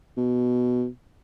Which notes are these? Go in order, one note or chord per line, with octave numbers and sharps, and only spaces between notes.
B2